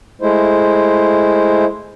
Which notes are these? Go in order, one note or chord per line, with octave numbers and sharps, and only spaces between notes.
G#3 A3 E4 C5